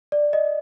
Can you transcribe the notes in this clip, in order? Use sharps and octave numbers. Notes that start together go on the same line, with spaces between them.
D5
D#5